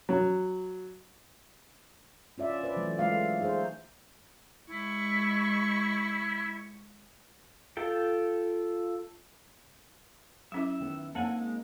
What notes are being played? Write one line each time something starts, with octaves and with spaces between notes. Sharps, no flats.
F#3
C#4 F4 D5 E5
B4 C5 D5
E3 F#3 A3
G#3 A3 F4 F5
D#4 G#4 C5
G#3 E4 C#6
F4 A4 G5
F#3 C#4 E4 E5
D#3 B3
A#3 C4 D#4 A4 F#5 G#5
G#3